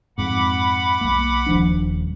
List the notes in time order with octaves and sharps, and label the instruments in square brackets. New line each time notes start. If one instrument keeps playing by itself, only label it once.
[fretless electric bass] F2 G#2 [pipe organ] F#5 B5 D6
[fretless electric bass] B1 A#3
D#1 F3 D4